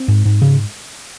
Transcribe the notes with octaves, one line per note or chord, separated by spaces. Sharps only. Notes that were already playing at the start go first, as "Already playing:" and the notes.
Already playing: C4
G#2
G#2
C#3